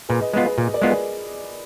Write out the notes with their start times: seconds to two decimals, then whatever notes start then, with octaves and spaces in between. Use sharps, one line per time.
0.09 A#2 G#4 B4
0.21 B4 D#5
0.33 G#3 B3 F4 B4 D#5
0.45 G#4 B4
0.57 A#2 G#4 B4
0.74 A#4 D5
0.82 G#3 B3 F4
0.89 G#4 B4